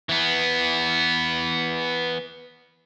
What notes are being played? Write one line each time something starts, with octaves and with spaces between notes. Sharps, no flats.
E3 B3